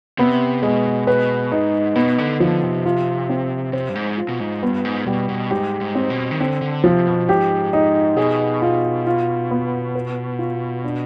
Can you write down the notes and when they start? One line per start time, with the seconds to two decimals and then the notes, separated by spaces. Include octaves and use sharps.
0.18 C3 B3
0.62 B2 G#3
1.07 B2 B4
1.52 G#2 D#4
1.96 B2 B3
2.18 D3
2.40 D3 F3
2.63 C3
2.85 F4
3.29 C4
3.73 C3 C5
3.89 G2
3.95 G#2
4.18 F4
4.29 B2
4.40 G#2
4.62 G2 B3
4.85 G#2
5.06 B2 G3
5.29 B2
5.51 G#2 G4
5.81 G#2
5.95 C4
6.10 B2
6.31 D#3
6.40 D3 C4
6.62 D3
6.84 C3 F3
7.07 B2
7.29 G#2 G4
7.73 D#4
8.17 B2 G#4
8.62 F4
9.07 F4
9.51 B3
9.95 B4
10.39 F4
10.84 D4